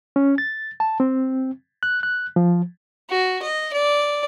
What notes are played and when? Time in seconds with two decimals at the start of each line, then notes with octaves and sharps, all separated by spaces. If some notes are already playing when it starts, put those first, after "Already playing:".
0.16 C#4
0.38 A6
0.80 A5
1.00 C4
1.83 F#6
2.03 F#6
2.36 F3
3.10 F#4
3.42 D#5
3.73 D5